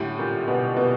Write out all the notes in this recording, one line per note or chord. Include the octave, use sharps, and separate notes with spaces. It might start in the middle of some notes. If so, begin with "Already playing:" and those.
Already playing: F#2 A2 D3 G3
A#2
B2
B2